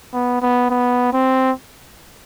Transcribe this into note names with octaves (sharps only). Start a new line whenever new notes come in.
B3
B3
B3
C4